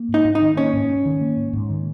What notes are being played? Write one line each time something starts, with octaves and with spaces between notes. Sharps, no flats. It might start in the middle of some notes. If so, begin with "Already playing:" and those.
Already playing: A#3
G#2
D#4
G#2
D#4
D#3
A#3 C#4
G#2
G#2
D#3
A#3
G#2
G#2
D#3